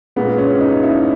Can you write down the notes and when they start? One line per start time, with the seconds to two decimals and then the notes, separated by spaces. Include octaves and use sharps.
0.16 A#2 G#3 B3
0.38 C#4
0.61 D#4
0.83 E4